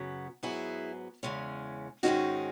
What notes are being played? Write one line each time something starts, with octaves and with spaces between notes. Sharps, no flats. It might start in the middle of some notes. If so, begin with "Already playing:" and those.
Already playing: F#2 C#3 F#3 B3
G#2 F#3 B3 E4 G#4
E2 C#3 G#3 C#4
G#2 D#3 G#3 C#4 D#4 F#4